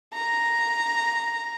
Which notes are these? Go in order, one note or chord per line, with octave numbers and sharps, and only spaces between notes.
A#5